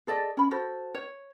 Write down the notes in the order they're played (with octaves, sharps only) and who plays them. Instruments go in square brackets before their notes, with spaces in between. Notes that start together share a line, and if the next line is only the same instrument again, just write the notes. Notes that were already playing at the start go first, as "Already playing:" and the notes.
[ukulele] G#4 A4 D5 D#5
C#4 B5
F#4 A4 C5
C#5